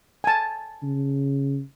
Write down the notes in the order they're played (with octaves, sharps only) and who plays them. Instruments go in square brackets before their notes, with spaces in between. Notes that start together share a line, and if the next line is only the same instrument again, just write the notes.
[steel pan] G#5 A5
[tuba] C#3